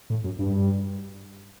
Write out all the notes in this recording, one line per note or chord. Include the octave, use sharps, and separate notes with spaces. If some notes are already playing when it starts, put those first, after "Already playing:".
A2
F#2
G2